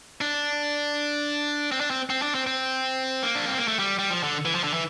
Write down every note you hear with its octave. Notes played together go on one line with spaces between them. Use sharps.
D4
C4
D4
C4
C4
D4
C4
C4
A#3
D4
C4
A#3
A3
G3
G3
F3
D3
E3
F3
D3
E3